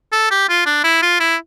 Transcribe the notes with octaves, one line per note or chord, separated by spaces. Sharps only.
A4
G4
F4
D4
E4
F4
E4